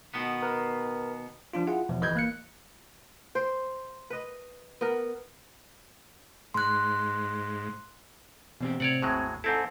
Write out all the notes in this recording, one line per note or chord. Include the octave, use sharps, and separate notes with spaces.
B2 D#3 B3
A#4 B4
F3 D4 F4
E4 F4 G#4 F#5
E2 B2 F3
G1 E3 D#5 B5 G6 G#6
A#3 F#6 C#7
C5
B4 D#5
B3 A#4
G#2 C6 F#6
E2 B2 C4 G4
A2 C3 C4 C#5 D5 F#5
G#1 D#2 A2 F#3 G#3
G#2 C4 E4 A4